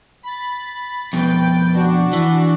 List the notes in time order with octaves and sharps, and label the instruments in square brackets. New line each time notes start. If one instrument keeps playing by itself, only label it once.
[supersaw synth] B5 A6
[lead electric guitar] F2 B2 [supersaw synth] B4 G5 A6
[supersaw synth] D4 F#4 D5
[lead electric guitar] E3